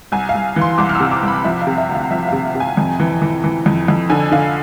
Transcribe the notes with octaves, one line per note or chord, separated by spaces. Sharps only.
C2 G#5
F5
C2
E3
C6
C2 D6
F6
E6
C3
D6
C2 B5
F3 E5
F5
C3
E5
D2
F5
F3 E5
C3 F5
C3
G#5
F2
E3
E3
E3
F2
F2
D3 G#5
D3 F5